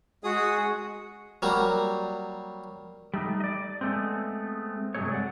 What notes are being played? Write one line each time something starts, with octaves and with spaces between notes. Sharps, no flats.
G#3 F#4 G#4 D#6
F#3 G3 A#3
G3 A3 D#4
D5 D#5
G#3 A3 B3 C4
G2 C3 F#3 G#3 A3 C#5
D5 F#5